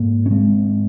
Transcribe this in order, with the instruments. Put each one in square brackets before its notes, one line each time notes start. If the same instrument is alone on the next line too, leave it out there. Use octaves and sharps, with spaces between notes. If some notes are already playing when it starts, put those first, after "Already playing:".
Already playing: [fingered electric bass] G#2 A#3
C#4
G#3 C4